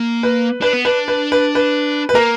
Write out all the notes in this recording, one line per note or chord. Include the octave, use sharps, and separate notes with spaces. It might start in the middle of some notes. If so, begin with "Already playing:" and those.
Already playing: A#3
B4
D4 B4
B3
D4 B4
B4
B4
B4
B4
A#3 A#4